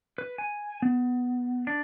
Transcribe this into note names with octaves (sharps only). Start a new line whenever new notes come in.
B4
G#5
B3
D4